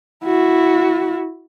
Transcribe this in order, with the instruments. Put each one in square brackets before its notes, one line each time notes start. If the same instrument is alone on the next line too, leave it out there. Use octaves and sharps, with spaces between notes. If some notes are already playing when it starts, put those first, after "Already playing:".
[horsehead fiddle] E4 F#4